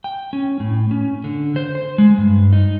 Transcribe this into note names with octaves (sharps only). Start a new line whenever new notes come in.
G5
C#4
A2
C#4
D3
C5
C5
G#3
G2
D#4